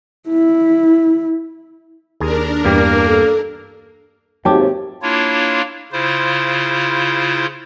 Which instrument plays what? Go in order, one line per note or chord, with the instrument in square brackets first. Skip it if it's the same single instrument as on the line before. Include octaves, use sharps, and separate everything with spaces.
[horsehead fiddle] E4
[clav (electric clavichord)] D#2 G#4 [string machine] D4 A#4
[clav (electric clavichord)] E2 G2 G4 [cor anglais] A#3
[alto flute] A4
[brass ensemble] G#1 D#2 [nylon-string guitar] G4 C#5 [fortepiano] G5 A5 D6
[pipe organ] A#3 D4 E4 F4 C#5
C#3 E4 F4 C5